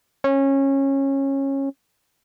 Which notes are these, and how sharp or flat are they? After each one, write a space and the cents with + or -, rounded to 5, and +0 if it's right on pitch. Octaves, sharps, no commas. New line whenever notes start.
C#4 -20